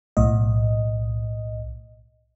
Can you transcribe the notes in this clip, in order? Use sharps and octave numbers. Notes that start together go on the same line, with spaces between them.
B1 A2 D#5